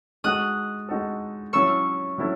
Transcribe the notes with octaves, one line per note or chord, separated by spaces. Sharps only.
G#3 D#4 F#4 A4 D#6 F#6
G#3 D#4 F#4 A4
F#3 C#4 E4 A4 C#6 E6
F#3 C#4 E4 A4